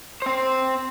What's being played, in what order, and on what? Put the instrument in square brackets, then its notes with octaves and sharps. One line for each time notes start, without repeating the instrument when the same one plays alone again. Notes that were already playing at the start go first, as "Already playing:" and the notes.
[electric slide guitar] C4 C5